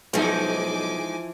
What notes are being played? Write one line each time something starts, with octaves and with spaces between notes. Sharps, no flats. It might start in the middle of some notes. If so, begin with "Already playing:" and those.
B1 E3 F3 G#3 D#4 C5 G#5 D6